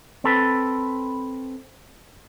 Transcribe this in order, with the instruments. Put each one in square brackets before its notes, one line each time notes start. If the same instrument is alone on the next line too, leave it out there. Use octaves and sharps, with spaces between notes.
[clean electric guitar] C4 A4 B4